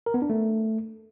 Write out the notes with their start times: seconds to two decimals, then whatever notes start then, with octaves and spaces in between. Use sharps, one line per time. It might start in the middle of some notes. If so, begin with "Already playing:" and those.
0.06 A#4
0.14 B3
0.22 D4
0.30 A3